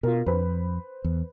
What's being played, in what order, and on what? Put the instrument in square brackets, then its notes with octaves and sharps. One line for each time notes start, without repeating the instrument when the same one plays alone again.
[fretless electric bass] B2 [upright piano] F4 A#4
[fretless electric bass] F2 [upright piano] B4 C5 B5
[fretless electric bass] E2